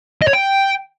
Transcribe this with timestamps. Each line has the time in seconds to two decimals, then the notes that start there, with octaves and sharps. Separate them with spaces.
0.22 D#5
0.27 C#5
0.33 G5